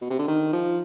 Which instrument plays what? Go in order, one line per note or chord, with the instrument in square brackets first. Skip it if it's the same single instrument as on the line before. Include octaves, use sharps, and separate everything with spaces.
[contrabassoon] B2
C3
D3
D#3
F3